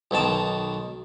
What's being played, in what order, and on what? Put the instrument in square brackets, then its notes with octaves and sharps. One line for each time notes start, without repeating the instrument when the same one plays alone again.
[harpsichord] B1 B2 D#3 A5